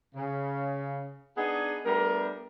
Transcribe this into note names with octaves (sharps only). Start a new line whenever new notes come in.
C#3
B3 D4 D#4 G#4
G3 A3 B3 D4 A#4